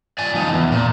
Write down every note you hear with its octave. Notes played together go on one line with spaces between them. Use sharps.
D5 G#5
F3 D#4
E2
A#2